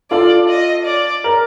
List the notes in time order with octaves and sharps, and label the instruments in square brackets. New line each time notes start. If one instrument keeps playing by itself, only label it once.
[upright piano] F4 A4 [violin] D5
[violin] D#5
D5
[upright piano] A#4